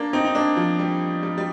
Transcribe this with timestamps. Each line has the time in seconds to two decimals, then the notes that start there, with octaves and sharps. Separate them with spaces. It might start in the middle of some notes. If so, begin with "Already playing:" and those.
Already playing: A#3 D4
0.13 C4 D#4
0.25 D#4
0.35 A#3 D4
0.57 F3
0.79 G3
1.23 G3
1.38 G3